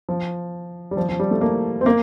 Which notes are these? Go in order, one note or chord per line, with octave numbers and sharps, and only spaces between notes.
F3
G3
F3
F3
G3
A3
A#3
C4
A#3